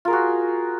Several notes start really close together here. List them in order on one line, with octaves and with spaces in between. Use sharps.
F4 A#4 G#4 F#4